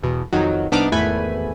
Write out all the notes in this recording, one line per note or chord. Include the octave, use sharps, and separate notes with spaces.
E2 B2
F2 D#3 F#3
C2 B3 D4 D#4 D6 F6
G#1 E2 A3 B4 G#5 B5